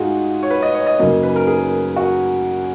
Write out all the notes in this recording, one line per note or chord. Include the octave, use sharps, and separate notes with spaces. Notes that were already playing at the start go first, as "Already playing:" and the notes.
Already playing: G#2 D#4 F4 F#4 G#4
C#5
B4
D#5
C#5
D#5
F#2 C#3 F#3 A#3 D#5
B4
A#4
G#4
F#4